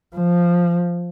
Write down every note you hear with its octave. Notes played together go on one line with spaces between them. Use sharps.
F3